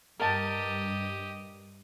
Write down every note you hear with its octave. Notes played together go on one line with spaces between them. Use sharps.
G2 G4 A#4 D#5 A5